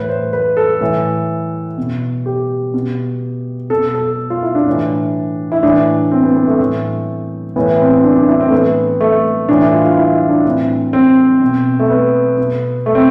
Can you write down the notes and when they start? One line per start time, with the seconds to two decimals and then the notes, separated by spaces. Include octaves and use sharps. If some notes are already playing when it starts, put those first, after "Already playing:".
Already playing: A2 E3 B4
0.09 C5
0.33 B4
0.57 A4
0.81 A2 E3
1.78 B2
2.26 G4
2.74 B2
3.70 B2 A4
3.94 A4
4.30 F4
4.43 E4
4.55 D4
4.67 A2 E3
5.52 E4
5.63 A2 E3 D4
6.11 C4
6.23 B3
6.35 B3
6.47 A3
6.59 A2 E3
7.56 A2 E3 B3
7.80 C4
8.04 D4
8.16 D4
8.28 E4
8.40 C4
8.48 A3
8.52 A2 E3 B3
9.01 A3
9.49 A2 E3 D4
9.61 E4
9.73 F4
9.85 F4
9.97 E4
10.13 E4
10.29 D4
10.45 A2 E3 C4
10.93 C4
11.42 B2
11.80 A3
11.90 B3
12.38 B2
12.86 A3
12.95 C4